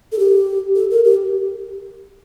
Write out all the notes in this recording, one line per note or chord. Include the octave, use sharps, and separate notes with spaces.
A4
G4
A4
A#4
G4